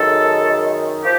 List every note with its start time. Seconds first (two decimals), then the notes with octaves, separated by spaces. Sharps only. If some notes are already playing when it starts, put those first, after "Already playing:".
Already playing: F#2 D#3 G#3 A4
1.03 F3 G4